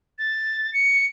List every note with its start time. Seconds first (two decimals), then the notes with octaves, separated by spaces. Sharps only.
0.19 A6
0.73 C#7